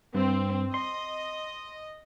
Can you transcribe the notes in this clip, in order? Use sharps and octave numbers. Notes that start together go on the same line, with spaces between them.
G2 C4
D#5 C6